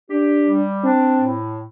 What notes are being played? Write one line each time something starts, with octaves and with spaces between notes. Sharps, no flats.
D4 G4
G3
C4 D4
A2